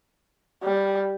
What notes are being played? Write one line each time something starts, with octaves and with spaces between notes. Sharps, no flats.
G3